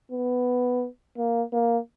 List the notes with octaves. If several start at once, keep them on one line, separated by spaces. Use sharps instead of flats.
B3
A#3
A#3